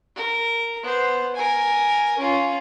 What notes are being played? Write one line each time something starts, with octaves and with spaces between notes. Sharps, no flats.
A#4
B3 C5
A#4 G#5
C#4 F4